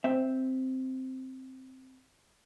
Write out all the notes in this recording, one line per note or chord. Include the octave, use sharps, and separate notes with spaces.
C4 E5